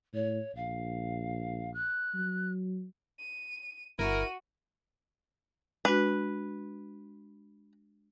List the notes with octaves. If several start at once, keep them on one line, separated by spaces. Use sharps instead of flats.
A2 C#5
A#1 F5
F#6
F#3
D#7
G1 E4 F#4 A#4 D#7
G#3 D4 F#4 B4